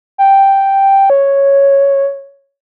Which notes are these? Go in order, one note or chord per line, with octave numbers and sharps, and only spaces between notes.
G5
C#5